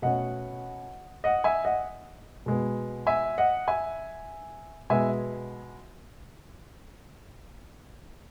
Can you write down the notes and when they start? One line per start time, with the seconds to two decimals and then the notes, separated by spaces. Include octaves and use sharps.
0.02 B2 A3 C#4 D#5 F#5
1.24 D#5 F#5
1.44 E5 G#5
1.65 D#5 F#5
2.46 B2 G#3 B3
3.07 E5 G#5
3.38 D#5 F#5
3.68 E5 G#5
4.90 B2 G#3 B3 E5 G#5